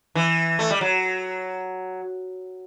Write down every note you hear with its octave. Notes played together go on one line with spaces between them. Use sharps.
E3
A3
G3
F#3